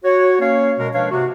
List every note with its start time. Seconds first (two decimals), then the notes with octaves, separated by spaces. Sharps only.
0.04 F#4 C#5
0.40 A#3 C#4 C#5 F5
0.78 B2 G#3 A#4
0.94 F3 G#3 D4 B4 C#5 F5
1.11 G#2 C3 F#4